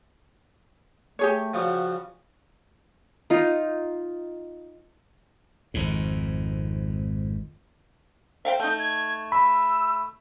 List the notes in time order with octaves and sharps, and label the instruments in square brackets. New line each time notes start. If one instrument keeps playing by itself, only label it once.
[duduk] A3 [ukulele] G4 G#4 C#5
[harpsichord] C#3 F3 G3 [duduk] F#4
[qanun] D#4 F4
[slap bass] G#1 F2 G#2
[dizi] C5 [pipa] E5 F5 G5
[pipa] A3 D#4 [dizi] G6
[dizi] G#6
[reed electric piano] B5 [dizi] E6